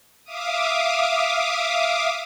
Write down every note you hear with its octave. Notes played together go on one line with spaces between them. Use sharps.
E5 F5 D6 D#6